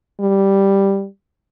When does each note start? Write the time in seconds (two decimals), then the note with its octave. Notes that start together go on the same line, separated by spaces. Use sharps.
0.20 G3